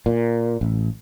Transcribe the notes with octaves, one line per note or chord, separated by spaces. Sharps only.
A#2
A1